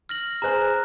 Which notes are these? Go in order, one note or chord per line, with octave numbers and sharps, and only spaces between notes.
F6 A#6 F#7
G#4 C5 G#5 A#5 F#6